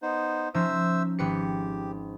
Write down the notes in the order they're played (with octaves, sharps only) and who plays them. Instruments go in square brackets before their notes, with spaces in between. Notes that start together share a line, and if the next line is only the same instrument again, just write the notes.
[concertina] B3 D#4 C5
[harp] F3 C#4 D#4 [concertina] C5 E5 E6
[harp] G#1 B4 C#7 [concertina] G4